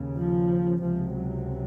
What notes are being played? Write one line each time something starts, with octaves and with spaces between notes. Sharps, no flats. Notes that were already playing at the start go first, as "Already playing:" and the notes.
Already playing: D#2 C#3
F3
C#2 C3 F3
F#3